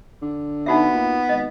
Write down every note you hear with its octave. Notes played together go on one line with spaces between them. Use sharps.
D3
B3 D#4 F#4 E5
A#2
G#1 D#5